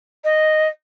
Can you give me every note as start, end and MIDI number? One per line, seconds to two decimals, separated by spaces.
0.24 0.68 75